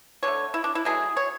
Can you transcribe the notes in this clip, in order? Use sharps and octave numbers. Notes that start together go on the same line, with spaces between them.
D3 A3 C#5
E4
D4
E4
B2 F#3 A3 G#4
C#5